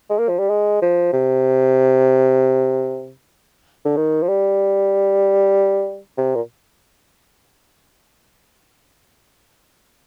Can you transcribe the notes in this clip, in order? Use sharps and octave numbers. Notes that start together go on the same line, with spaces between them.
G#3
A#3
F3
G3
G#3
F3
C3
D3
D#3
F3
G3
C3
A#2